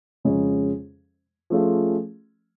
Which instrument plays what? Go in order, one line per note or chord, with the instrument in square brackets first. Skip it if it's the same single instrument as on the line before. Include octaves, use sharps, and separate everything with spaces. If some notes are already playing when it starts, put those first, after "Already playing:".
[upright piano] F2 C#3 G#3 C#4 G#4
F3 A3 C#4 F4 G#4